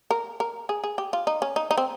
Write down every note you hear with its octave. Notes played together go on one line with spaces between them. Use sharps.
A#4
A#4
G#4
G#4
G4
F4
D#4
C#4
D#4
D#4
C4